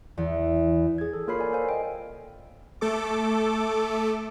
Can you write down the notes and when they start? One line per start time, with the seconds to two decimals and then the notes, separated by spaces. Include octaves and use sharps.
0.17 E2
0.98 G#4 G#6
1.13 A4
1.28 A#3 F4 A#4 C#5 B5 C7
1.39 D5 G#5
1.52 A4 C5 F5 G#5
1.69 D#5 G5
2.81 A3 A4 D6